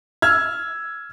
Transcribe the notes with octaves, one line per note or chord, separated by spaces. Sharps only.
E6 F6 G#6